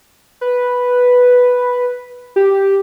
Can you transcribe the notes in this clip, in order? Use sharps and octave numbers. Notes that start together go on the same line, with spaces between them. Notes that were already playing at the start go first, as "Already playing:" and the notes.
B4
G4